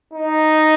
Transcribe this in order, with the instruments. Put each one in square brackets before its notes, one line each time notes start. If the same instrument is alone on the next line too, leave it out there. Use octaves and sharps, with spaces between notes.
[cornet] D#4